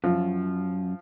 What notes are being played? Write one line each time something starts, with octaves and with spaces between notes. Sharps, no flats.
F#2 F3